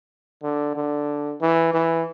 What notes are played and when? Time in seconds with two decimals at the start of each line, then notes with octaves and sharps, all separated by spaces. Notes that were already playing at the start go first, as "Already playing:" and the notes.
0.43 D3
0.75 D3
1.41 E3
1.73 E3